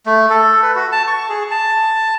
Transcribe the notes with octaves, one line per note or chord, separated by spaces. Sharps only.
A3
A4
B4
F#4
A5
C#6
G#4
A5